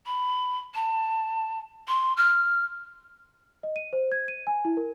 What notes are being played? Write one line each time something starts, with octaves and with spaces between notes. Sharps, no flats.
B5
A5
C6
F6
D#5
D#7
C5
G#6
D#7
G#5
E4
A#4